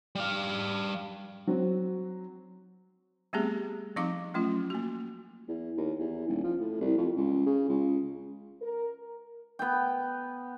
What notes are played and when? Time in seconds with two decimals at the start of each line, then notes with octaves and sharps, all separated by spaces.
0.15 G3 F5
1.47 F#3 C4 F#4
3.33 G3 A3 B3 C4 G4 G#4
3.96 F3 C4 D#4 F5 D6
4.34 F#3 A3 C#4 F4
4.70 A#3 F#4
5.48 E2
5.77 D#2
5.99 E2
6.28 D#1
6.44 F3
6.60 A2
6.81 C2
6.98 F2
7.16 C#2
7.46 C#3
7.69 C#2
8.62 A#4
9.59 B3 G5